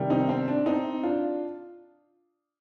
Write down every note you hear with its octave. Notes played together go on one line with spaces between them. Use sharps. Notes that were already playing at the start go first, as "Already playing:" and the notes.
Already playing: C3 D#3 G3
C4 D#4
C4
D4
C4 D#4
D4 F4